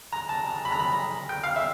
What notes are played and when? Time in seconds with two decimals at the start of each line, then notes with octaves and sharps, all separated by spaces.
0.13 A#5
0.29 A5
0.47 A#5
0.65 B5
0.72 A#5
0.79 B5
1.29 G5
1.44 F5
1.56 E5